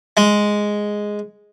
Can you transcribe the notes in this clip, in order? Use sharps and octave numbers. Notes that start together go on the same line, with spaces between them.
G#3